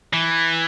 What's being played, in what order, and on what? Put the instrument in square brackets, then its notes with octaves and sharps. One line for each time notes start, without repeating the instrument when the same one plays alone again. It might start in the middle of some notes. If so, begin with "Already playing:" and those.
[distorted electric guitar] E3